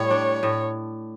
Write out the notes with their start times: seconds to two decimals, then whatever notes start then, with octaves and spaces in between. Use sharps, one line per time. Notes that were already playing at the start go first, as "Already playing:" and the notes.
Already playing: A2 G3 C#5
0.10 D4
0.43 A2